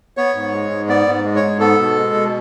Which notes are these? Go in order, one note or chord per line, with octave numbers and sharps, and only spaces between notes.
B3 C#5
G#2
G#3
G#2
B3 D5
G#2
G#3
C#5
G#2
B3 A4
B2
G#3
B2